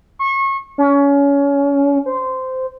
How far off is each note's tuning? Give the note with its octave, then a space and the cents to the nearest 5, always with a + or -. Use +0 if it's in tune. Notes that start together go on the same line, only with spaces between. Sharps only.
C#6 -30
C#4 +25
C5 -15